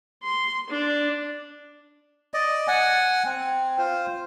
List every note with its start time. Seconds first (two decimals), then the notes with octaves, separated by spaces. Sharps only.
0.23 C6
0.70 D4
2.34 D5 D#5
2.68 F#5 G#5
3.25 C4
3.78 F4 C5